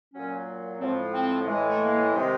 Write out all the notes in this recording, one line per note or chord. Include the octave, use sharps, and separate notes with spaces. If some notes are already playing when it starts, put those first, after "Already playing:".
A#2 F#3 C#4
A2 F3 G#3 C4
C4
A2 E3 G#3
A3
A#3
C3 D#3 G#3